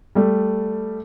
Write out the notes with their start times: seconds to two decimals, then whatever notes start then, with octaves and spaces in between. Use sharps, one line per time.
0.15 G3 A3